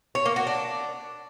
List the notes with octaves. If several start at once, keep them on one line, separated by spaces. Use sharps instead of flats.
C#5
A#3
F#4
D4